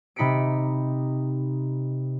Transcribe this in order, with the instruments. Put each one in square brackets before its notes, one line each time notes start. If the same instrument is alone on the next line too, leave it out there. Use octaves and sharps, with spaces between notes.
[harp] C3 D#4 B5 B6 C#7 D7